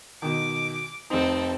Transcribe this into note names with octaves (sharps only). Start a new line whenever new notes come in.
B2 D#3 D6
F1 C4 D#4 A4